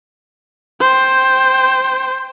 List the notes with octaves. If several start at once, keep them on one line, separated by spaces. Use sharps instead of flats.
C5 G5